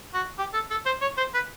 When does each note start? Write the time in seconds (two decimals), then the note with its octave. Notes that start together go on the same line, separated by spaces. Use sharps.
0.14 F#4
0.39 G4
0.54 A4
0.70 A4
0.85 C5
1.02 C#5
1.17 C5
1.34 B4